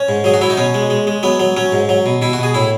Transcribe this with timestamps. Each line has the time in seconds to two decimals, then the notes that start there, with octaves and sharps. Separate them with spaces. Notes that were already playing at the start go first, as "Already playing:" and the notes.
Already playing: C#4
0.09 G#2
0.24 F#3 G#4
0.34 F#4
0.41 F#3 E4
0.50 D#4
0.57 B2 C#4
0.74 G#3
0.90 G#3
1.07 G#3
1.23 F#3 B3
1.40 F#3
1.57 F#3 C#4
1.72 G#2
1.89 F#3
2.06 B2
2.22 B2 E4
2.33 F#4
2.38 B2 G#4
2.54 A2 E4